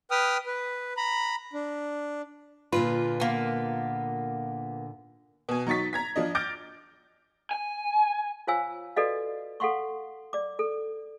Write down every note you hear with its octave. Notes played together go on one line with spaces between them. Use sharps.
B4 G5 D#6 F6
B4
A#5 B5
D4
A#2 D3 F4 B4
A#3 B3
B2 G#5
F#3 D#4 C#6 A6 B6
A#5 G#6 B6
F3 D4 D#5
D6 F6 G6 A6 A#6 D7
G#5
F4 C5 C#5 F5 G#5 E6
F#4 A4 B4 D5 D#5 F5
A4 F5 F#5 C6 C#6
D5 D6
A4